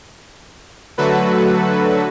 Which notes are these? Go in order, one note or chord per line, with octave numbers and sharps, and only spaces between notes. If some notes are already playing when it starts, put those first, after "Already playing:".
D3 F#3 A3 F#4 A4 B4